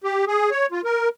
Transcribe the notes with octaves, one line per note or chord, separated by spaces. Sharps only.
G4
G#4
C#5
F4
A#4